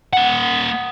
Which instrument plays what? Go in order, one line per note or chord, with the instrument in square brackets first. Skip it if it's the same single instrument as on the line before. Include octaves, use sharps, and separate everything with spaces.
[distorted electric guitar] A#3 F#5